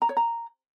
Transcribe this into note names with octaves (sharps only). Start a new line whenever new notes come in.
A#5
C#5
A#5